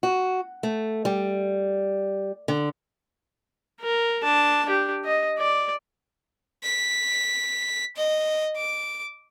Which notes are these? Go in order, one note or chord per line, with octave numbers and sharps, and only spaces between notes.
F#4
A3
G3
D3
A#4
D4 A5
D4 G4
D#5
D5
B6
D#5
D6